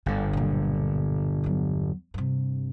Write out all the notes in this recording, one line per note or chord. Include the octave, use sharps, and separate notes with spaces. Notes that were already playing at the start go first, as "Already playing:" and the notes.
G1 G#2 D3
B1 A#2
E2 F#3
G2 C3